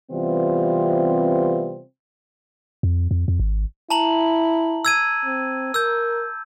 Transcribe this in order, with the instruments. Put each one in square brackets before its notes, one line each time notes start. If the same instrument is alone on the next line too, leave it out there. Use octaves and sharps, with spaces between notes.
[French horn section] C3 E3 G3 B3 C4 F4
[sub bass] F2
F2
F2
G#1
[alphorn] E4 [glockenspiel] A5 A#5 F#7
[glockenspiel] E6 G#6 D#7
[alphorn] C4
[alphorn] A#4 [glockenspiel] E6 G6